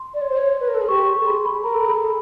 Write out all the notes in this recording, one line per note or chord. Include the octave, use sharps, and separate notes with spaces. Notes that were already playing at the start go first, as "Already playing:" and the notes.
Already playing: C6
D5
C#5
C5
C#5
B4
A#4
A4
G#4
G4 C#6
C6
A4
G#4 B5
B5
A#4 A#5
A4
G#4 B5
A4